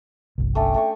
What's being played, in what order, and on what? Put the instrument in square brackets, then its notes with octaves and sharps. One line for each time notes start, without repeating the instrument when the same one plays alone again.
[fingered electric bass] G1 C2
[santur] A3 C#4 D4 [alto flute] G5
[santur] A3 D4 C#6